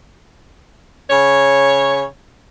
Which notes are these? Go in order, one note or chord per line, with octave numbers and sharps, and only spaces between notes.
C#3 C#5